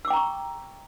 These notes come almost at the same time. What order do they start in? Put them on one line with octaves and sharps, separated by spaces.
E6 D6 G5 A#5 C#6